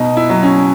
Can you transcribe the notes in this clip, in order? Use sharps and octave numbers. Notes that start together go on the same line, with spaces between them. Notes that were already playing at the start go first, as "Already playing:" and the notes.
Already playing: B2 D#4
E4
F#3
C#4